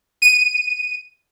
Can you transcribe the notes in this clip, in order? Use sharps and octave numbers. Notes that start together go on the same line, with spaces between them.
D#7